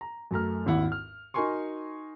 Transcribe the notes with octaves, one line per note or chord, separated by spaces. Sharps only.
A#5
F#2 A3 A#5 F6
G#1 D#2 E4 F#5
F6
D#4 F#4 A#4 G#5 C6 C#6